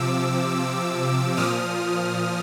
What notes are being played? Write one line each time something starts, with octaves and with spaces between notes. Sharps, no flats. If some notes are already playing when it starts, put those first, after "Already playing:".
Already playing: C3 F3 D6 E6
A#2 F3 D#6 F6